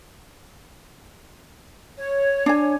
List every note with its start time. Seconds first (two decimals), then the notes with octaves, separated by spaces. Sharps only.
1.98 C#5
2.46 D4 G#5